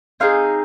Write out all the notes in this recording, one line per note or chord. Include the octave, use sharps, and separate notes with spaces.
C4 D#4 G#4 F5